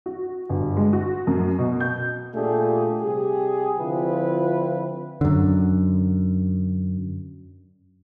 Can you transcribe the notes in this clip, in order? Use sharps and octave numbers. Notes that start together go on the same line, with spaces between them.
F#4
G1
G#3
F#4
F#2
B2
G6
A#2 A3 D4 F4 G4 G#4
C3 G3 G4 G#4
D3 F3 C4 E4 F4 B4
F#2 D3